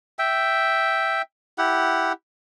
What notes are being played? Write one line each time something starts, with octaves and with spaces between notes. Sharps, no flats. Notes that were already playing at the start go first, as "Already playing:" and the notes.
E5 G5
E4 G4 F#5